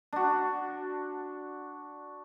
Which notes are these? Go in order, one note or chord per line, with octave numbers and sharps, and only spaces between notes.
D4 F#4